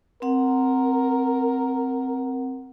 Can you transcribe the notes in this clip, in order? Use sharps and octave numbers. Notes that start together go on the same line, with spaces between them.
C4 A#4 F#5